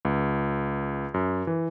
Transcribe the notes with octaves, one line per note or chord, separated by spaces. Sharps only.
C#2
F#2
E3